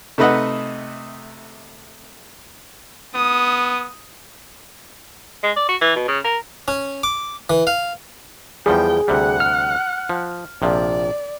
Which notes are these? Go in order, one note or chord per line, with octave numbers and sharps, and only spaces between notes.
C3 A3 D#4 B4 D#5 F#5
B3 D#6
G#3
D5
F#4
E3
B2
C#3
A#4
C#4
D6
E3
F5
E2 F3 G3 G#4 G5
D2 C3 G3 F#5
F6
F3
A#1 C3 F3 D5